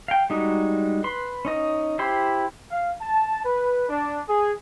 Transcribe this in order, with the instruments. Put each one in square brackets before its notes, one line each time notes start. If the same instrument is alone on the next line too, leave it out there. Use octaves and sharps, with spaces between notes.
[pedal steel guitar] F5 G5
G3 G#3 D#4 F#4
B4 C6
C#4 D#4 D#5
E4 G4 C5 C6
[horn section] F5
A5
B4
D4
G#4